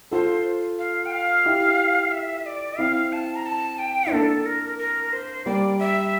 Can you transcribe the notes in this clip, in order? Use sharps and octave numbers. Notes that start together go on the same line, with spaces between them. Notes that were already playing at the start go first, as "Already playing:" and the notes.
F4 A4 C5
F5
G5
F5
E4 G4
E5
D5
C4 E4 F5
A5
A#5
A5
G5
E4
A#3 D4 A4
A#4
A#4
C5
G3 A#3 D5
E5